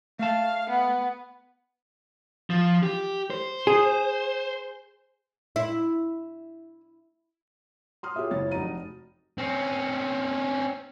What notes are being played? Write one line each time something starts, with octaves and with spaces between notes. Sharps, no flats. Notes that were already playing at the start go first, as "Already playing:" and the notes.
A3 F5 A5
B3
F3
G4
C5
G#4
E4
C6 D#6 F6
F4 G4 G#4 C#5 E5
F#1 G#2 E4 C#5 A6
F1 D#4 F#4 A#5 D#7
C4 C#4